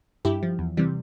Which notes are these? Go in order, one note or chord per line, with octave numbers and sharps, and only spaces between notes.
G2 E4 G4
F3
E2
C3 E3 G3